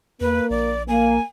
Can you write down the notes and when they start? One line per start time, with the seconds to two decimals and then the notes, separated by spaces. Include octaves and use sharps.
0.21 E2 A#3 B4
0.50 A#1 D5
0.88 A#3 G#5